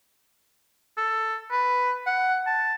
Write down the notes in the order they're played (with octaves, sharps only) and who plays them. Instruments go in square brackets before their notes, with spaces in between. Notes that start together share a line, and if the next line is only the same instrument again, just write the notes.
[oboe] A4
B4
F#5
A5